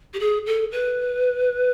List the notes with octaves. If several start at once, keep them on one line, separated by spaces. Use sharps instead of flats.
G4
G#4
A4
B4